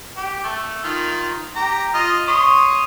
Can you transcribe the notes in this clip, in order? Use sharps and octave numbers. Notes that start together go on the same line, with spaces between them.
G4
A3
D#3 F4
G4 A#5
F4 D#5
C#5 C6 D#6